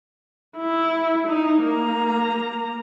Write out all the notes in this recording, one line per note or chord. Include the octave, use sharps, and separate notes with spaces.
E4
D#4
A#3 A#5